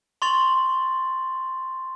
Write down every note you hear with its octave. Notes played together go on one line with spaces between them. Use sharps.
C6 C#6 A6 F7 F#7